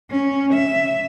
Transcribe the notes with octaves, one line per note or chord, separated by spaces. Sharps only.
C#4
E5